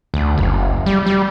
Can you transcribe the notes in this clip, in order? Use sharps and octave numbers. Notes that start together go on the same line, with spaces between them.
D2
F#1
G3
G3